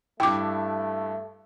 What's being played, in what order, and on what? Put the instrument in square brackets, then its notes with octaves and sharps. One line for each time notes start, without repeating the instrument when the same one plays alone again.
[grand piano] G2 E4 [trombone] A3 [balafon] G5 D6